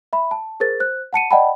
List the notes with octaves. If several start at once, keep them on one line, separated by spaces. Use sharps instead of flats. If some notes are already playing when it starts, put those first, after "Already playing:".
E5 B5
A5
G#4 A#4 C5 A6
C5 F#6
F#5 A5 C#7 D#7
D5 D#5 F#5 G5 A5 B5